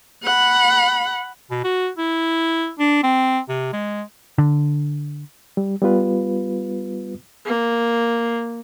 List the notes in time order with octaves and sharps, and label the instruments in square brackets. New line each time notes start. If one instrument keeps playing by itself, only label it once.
[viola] F#5 B5
[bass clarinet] B2
F#4
E4
D4
C4
C3
G#3
[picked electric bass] D3
[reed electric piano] G3
G3 B3 F4 B4
[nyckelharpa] A#3